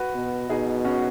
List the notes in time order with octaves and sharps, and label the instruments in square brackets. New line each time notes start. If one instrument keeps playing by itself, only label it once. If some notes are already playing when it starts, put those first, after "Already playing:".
Already playing: [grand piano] F#4 B4
[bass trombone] B2
[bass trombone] B2 [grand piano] D#4 G#4
[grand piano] C#4 F#4